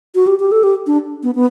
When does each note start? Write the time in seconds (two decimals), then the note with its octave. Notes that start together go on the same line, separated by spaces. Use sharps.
0.15 F#4
0.27 G4
0.40 G4
0.52 A4
0.63 G4
0.87 D4
1.23 B3
1.35 B3